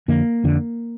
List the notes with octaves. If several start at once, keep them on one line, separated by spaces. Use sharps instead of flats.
F2 D3 A#3
F2 D3